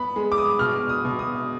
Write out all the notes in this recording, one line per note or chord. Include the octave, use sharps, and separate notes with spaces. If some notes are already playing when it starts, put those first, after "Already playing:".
Already playing: B3 B5
G#3
D6
D#6
B2 F6
D#6
B2
D#6